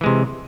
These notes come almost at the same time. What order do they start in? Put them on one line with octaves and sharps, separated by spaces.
E3 G#3 C3